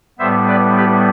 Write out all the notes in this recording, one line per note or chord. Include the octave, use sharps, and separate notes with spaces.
A2 G3 B3 C5 E5
B4 D5
G4 B4